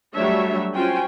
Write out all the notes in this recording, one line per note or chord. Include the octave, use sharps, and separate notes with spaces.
F#3 G3 A3 D4 C#5 E5
C#4 F4 F#4 C5 G5 G#5